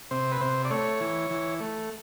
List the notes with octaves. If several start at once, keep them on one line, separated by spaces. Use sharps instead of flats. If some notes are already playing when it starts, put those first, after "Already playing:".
C3 C5
B4
C3 C5
D5
A3 C#5
E3
E3
A3